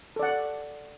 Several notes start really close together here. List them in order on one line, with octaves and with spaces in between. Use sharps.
A4 D5 F#5